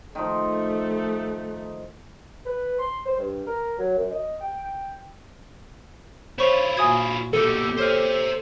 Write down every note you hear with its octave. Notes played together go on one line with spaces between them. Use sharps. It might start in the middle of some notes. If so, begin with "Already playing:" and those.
D#3 F3 A3
B4
C6
C5
G2
A#4
F#3
F#2
D#5
G5
E4 F4 C5 C#5 C#6
A#2 F#4 G#5 D#6 G#6
B2 A3 A#3 G4 A4
C5 C#5 E5 F6